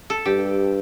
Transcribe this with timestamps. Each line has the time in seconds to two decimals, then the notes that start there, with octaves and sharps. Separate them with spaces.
0.10 A4
0.26 G2 G4